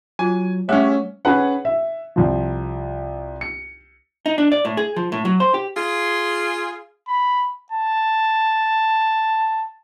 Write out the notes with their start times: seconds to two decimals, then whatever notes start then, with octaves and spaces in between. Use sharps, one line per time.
0.19 F#3 F4 G#5
0.69 G3 A3 C#4 G4 G#4 C#5 E5
1.25 C#4 G#4 B4 F#5
1.65 E5
2.16 C2 F3
3.41 C#7
4.26 D#4
4.38 D4
4.52 D5
4.65 A2
4.77 G#4
4.96 F3
5.12 A2
5.25 F#3
5.40 C5
5.54 G4
5.77 F4 G#4
7.08 B5
7.72 A5